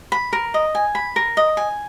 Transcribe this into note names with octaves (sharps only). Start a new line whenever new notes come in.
B5
A#4
D#5
G#5
B5
A#4
D#5
G#5